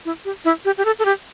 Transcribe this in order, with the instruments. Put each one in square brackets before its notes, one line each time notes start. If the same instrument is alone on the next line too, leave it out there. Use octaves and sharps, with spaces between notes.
[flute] E4
G4
E4
G4
G4
A4
A4
G4